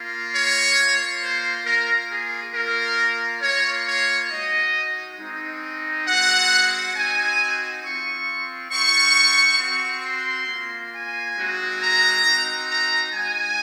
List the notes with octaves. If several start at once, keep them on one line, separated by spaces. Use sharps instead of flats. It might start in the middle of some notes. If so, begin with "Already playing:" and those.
Already playing: A#3 F4
C#5
A#3 F4
C5
A#3 F4 A#4
G#4
A#3 F4 A#4
A#3 F4 C#5
C#5
G#3 D#4 F#4 D#5
G#3 C4 D#4
G#3 C4 F#4 F#5
C4 D#4 F#4 G#5
C4 F4 C#6
C4 F4 C#6
C4 F#4
C6
A#3 F4
G#5
G#3 C4 D#4 F#4
A#5
C4 D#4 F#4
A#5
G#3 D#4 F#4 G#5